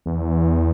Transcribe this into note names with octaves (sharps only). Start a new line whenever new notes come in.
E2